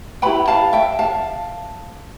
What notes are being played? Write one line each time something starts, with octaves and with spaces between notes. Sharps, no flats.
E4 G4 B4 G5 B5
F5 A5
E5 G5
F5 A5